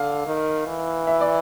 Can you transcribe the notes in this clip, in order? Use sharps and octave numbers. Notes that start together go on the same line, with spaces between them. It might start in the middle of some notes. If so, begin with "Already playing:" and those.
Already playing: D3 F5
D#3
E3
E5
D5